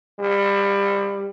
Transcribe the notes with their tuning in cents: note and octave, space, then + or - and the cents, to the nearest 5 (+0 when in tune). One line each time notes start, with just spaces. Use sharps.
G3 +25